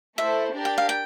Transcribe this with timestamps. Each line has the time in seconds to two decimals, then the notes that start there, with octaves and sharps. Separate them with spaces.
0.18 A3 E4 A4 C5 E5
0.54 D4 G4 A#4 D5
0.65 G5
0.78 F5
0.89 G5